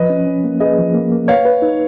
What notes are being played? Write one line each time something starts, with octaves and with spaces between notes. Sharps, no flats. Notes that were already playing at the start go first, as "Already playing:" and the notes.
Already playing: F3 B4 D#5
C#4
C#4
A#3
G#4 B4 D#5
F3
A#3
A#3
B4 C#5 F5
B4
D#4